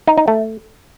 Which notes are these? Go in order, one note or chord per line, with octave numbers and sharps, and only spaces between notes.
D#4
D#4
A3